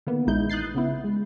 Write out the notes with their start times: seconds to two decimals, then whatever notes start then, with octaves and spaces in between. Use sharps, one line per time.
0.07 D3 D#3 A#3 B3
0.27 A#1 G#3 D#4 E4 G6
0.50 D#6 F#6 G6 A6 C7
0.74 C#3 B3 E4
1.04 G#3